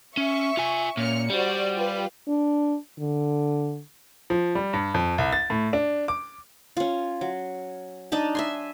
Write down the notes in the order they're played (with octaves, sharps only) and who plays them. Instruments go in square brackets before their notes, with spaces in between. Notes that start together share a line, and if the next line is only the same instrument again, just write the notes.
[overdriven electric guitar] C#4 [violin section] E5 C#6
[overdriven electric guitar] F4 G#5
[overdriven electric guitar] A#2 [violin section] C#4 F6 C#7
[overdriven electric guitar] G3 [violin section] F#4 C5 D5
[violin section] F4 G4 B4
[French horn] D4
D3
[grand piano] F3
G3
G2
F2
C2
A6
A2
D4
D6
[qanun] C#4 F4
F#3
D4 D#4 D#5 A5
E5 G#5 C6